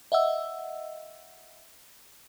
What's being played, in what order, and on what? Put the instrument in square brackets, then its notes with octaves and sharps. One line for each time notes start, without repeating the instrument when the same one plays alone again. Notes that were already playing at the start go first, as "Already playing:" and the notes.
[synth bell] D#5 E5 F#5 E6